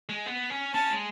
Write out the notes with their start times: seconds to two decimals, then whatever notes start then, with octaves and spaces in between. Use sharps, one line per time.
0.09 G#3
0.26 B3
0.50 C#4
0.74 C#4 A5
0.90 G#3